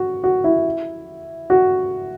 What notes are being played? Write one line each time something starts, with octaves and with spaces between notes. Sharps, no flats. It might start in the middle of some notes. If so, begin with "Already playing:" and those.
Already playing: F#4
F#4
E4
F#4